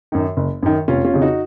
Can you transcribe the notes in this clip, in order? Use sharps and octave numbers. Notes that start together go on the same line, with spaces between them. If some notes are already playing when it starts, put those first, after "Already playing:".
F#2 D#3
F#1
F#2 D#3
F1 C#4 F4
C#4 F4
F2 C#3
D#4 F#4